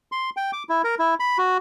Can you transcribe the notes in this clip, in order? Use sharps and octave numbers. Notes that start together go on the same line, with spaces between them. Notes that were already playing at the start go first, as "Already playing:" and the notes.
C6
G5
D6
E4
A#4
E4
B5
F#4